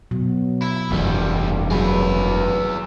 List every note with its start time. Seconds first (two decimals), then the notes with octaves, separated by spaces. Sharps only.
0.11 B2 F#3
0.62 E4
0.91 F1 C2 G2 E3 G3
1.71 F#3 G#4 B4